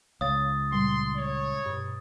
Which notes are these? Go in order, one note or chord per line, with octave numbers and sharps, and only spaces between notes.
C#2 C#5 F5 D#6 A6
A#2 G3 C6
C#5
G2 B2